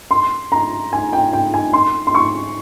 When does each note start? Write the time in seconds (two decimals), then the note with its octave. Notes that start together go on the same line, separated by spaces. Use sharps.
0.11 C6
0.52 A#5
0.93 G#5
1.13 G5
1.33 G5
1.54 G#5
1.73 C6
2.07 C6
2.15 C#6